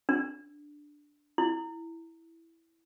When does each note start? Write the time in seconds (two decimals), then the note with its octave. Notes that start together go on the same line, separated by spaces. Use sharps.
0.09 D4
1.38 E4